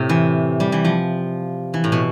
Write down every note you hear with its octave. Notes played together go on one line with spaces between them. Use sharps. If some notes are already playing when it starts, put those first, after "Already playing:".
Already playing: A2 C3
E3
G3
E3
F3
E3
A2
B2